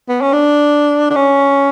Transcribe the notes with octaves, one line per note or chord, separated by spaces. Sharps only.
B3
C#4
D4
D4
C#4